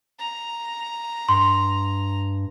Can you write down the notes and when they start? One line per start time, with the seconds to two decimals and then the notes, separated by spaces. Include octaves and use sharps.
0.18 A#5
1.29 G2 C6